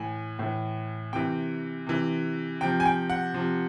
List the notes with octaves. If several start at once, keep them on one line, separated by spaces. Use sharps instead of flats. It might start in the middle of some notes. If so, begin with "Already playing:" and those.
Already playing: A2 E3 G#5
A2 E3
C3 E3 G5
C3 E3
C3 F3 G5
G#5
G5
F#5
C3 F3